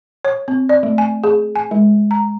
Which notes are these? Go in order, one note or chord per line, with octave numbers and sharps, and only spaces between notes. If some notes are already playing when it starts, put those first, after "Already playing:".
C#5
C4
D5
A3
G#5
G#4
G#5
G#3
A#5